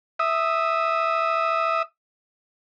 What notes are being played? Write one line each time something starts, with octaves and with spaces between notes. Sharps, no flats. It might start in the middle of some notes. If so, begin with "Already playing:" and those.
E5 D#6